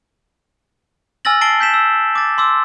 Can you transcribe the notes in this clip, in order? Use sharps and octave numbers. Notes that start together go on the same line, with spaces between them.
G#5 E6 F6 A6 A#6 F#7
A5 A6 C7 D7 G7
G6 B6 E7
E6
D6 A6
C6 D6 E6